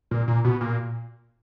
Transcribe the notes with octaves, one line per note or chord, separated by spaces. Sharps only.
A#2
A#2
B2
A#2